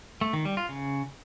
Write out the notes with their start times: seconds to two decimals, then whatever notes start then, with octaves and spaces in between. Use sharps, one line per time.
0.21 A3
0.33 D#3
0.45 G3
0.57 F4
0.69 C#3